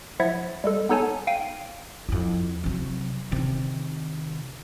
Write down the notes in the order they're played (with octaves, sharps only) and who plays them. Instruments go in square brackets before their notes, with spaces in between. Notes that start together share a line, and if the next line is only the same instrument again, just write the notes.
[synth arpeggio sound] F3 E4 E5 F#5 G#6 A6
G3 G#3 A4
B3 D#4 A4 C#5 G#5 A5
F5 G5 C7 D#7
[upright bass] F2 E4
C3 F#3
C3 D#3